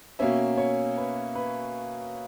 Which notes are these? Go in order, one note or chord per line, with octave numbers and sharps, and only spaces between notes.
B2 A#3 C#4 E5
C#5
B4
B4